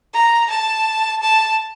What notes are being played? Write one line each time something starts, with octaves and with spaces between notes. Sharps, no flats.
A#5
A5
A5